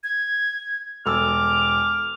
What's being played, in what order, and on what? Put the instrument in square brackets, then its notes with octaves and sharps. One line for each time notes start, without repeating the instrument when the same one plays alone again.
[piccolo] G#6
[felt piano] E1 A4 E6 [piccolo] D6 [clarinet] F6